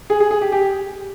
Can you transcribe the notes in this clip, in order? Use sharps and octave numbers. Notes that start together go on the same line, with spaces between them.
G#4
G#4
G#4
G4
G4